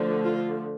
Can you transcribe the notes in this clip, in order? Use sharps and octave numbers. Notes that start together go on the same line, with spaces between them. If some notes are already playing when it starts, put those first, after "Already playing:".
Already playing: D3 F3 A3
F4